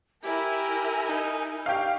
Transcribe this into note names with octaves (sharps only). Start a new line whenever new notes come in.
E4 G4 A#4 G#5
D#4
D4 G4 F5 C#6